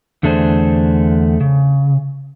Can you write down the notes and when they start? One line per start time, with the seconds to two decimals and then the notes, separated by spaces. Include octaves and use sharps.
0.23 E2 D3 A3 D4 G#4 C5
1.41 C#3